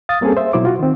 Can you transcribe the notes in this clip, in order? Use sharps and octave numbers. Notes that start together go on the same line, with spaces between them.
F5 D#6 A6
G3 A#3 C4 C#4 G#4 A4
C5 E5
B2 F#3 E4 C5 D6
F4 F#4
D#3 C4